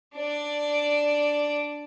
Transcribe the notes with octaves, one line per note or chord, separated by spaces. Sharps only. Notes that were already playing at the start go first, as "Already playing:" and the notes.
D4 D5